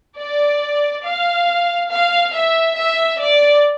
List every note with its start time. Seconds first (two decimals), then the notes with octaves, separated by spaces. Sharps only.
0.18 D5
1.04 F5
1.91 F5
2.33 E5
2.76 E5
3.19 D5